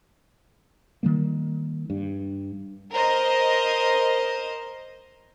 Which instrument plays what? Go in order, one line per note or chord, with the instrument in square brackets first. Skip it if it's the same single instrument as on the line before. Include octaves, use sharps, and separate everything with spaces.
[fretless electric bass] D#3 G3 A#3
G2
[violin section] A#4 C5 D#5